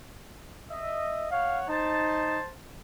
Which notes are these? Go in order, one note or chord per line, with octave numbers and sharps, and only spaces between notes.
D#5 E5
C#5 F5 F#5
D#4 C5 A5